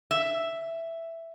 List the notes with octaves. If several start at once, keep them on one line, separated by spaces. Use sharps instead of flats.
E5